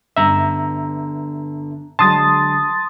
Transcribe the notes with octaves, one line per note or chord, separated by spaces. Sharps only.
G2 D3 B3 E5 A#5
D3 F#3 G#3 A5 C6 D#6 A6